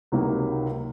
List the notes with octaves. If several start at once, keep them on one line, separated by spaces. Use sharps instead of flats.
C#2 C3 D#3 F#3 A#3